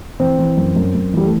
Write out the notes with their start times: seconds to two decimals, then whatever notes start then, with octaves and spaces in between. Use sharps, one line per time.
0.20 E3 C4
0.38 E3
0.57 F#2
0.76 F#2
0.95 F#2
1.13 E3 G3
1.25 A3